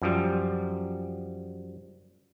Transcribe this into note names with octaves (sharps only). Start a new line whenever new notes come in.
F#2 F3 G3